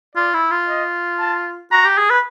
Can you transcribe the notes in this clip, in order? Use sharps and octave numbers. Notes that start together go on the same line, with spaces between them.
F4 D5
E4
F4
D#5
A5
F#4 A#5
G4
G#4
B4